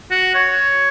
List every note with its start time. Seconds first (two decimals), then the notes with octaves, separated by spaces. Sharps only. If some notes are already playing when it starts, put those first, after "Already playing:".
0.11 F#4
0.35 C#5